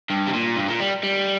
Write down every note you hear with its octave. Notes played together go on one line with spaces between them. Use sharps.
G2
C3
A#2
G2
A#2
G3
G3